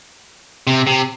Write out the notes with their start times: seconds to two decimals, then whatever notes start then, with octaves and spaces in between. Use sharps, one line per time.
0.67 C3
0.87 C3